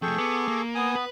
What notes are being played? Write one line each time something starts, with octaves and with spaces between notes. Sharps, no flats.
F2 A3 G#4 A4 G5 C#6
B3 D6
A#3
B3 G#5 D#6
B4